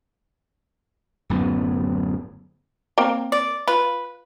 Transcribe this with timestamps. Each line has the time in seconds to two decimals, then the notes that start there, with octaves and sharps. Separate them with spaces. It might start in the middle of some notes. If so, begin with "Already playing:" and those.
1.30 D1 F#2 A2 B3
2.98 A#3 C4 A#4
3.32 D5
3.68 F4 B4